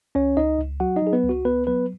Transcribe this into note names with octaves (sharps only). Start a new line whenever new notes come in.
C#2 C#4 C#5
C#2 D#4 D#5
C#2
F#3 F#4 F#5
D#4 D#5
F#3 G#4
B3 B4
C#2
F#4
C#2 B3 B4
F#3 B3 B4